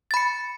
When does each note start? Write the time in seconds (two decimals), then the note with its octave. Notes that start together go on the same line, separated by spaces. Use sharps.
0.11 A6
0.14 B5
0.17 C#7